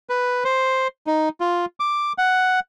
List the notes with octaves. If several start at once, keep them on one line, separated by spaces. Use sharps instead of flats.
B4
C5
D#4
F4
D6
F#5